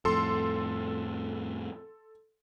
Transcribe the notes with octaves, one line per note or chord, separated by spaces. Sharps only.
F2 A2 A4 C6